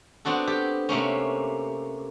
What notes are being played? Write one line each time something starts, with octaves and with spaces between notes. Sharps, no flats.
B3 C4 D4 F#4 A4
G4 A4
C3 A3 A#3 C#4